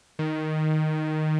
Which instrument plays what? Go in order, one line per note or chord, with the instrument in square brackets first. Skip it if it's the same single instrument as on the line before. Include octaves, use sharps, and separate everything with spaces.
[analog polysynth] D#3